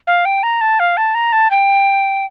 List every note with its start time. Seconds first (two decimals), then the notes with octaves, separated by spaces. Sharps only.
0.07 F5
0.25 G5
0.43 A#5
0.61 A5
0.80 F5
0.97 A5
1.14 A#5
1.32 A5
1.50 G5